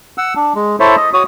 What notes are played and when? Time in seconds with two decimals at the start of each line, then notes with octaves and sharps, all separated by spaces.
0.18 F#5 E6
0.36 D4
0.55 G#3
0.80 E4 A4 C5 C#5 E5
0.96 D#5
1.13 F#4 C#5 D#6